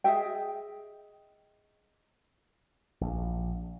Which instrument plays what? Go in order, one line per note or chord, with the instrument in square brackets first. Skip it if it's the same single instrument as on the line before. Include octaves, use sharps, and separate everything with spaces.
[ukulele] G#4 D#5 E5 G5
[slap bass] A#1